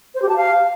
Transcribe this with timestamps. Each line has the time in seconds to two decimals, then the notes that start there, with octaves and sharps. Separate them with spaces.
0.15 C5
0.22 G4
0.29 A5
0.36 F5